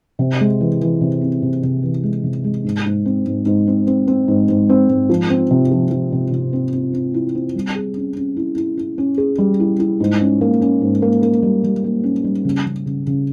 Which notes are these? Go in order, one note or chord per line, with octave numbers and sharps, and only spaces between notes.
C3
G#3
E3
E3
C3
C4
C3
C3
E3
G#3
C3
G#3
G#2
G#2
C4
G#2
G#2
C4
C4
C4
G#2
G#2
C4
G#2
F3
C4
C3
F3
F3
C3
C3
C4
C4
C4
E4
C4
G3
G#4
C#4
C#4
E4
E4
E4
C#4
G#4
G3
E4
E4
G#2
C#4
A#3
C#4
G#2
A#3
A#3
G3
G3
A#3
C#4
G3
C#3
C#3
C#3
C#3